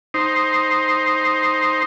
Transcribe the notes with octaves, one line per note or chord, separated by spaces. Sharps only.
D#4 C5